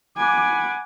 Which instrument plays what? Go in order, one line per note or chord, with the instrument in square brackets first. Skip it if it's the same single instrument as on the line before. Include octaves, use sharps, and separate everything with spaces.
[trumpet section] F#5 B5 D6 [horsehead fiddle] G#5